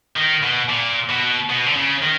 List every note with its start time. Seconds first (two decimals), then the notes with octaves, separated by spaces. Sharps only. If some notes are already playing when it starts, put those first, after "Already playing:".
0.17 D#3
0.43 B2
0.70 A#2
1.10 B2
1.50 B2
1.67 D3
1.76 C#3
2.02 D#3